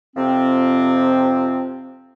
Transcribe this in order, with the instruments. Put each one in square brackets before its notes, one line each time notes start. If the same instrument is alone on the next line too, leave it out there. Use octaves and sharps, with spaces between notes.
[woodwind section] F2 C3 F3 C4